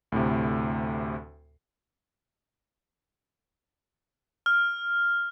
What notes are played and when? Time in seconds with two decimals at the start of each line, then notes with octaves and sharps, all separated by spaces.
0.12 D2 A2 C3
4.46 F6